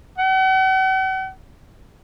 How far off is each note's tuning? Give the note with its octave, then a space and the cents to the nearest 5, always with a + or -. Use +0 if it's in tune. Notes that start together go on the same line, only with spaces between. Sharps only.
F#5 +45